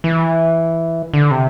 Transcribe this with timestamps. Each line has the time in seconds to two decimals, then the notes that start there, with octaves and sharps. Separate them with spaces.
0.04 E3
1.14 D3
1.31 C3